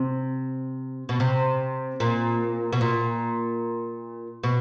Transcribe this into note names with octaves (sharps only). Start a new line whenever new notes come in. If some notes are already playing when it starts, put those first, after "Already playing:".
Already playing: C3
B2
C3
A#2
B2
A#2
B2